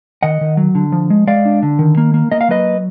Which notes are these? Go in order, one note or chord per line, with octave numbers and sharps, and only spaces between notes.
D#3 D#5 F#5
D#3
F#3
D3
F3
G#3
G#3 D5 F5
D4
D3
D#3
A#3
A#3
A#3 D#5
F5
F#3 B4 D#5